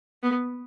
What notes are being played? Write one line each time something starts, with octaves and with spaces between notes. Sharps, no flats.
B3